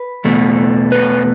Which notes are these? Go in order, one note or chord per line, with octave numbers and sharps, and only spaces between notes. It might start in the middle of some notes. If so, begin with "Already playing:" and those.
Already playing: B4
E2 B2 A3
B4